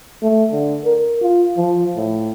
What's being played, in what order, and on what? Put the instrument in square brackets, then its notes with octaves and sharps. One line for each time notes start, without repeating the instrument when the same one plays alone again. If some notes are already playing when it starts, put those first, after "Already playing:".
[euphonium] A3
D3
A#4
F4
F3
A2